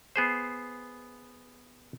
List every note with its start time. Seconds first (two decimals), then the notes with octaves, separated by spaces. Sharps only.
0.16 B3 G#4 C5